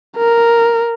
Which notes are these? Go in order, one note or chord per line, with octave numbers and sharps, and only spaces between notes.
A#4